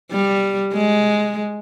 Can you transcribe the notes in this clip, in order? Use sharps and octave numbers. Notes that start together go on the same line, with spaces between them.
G3
G#3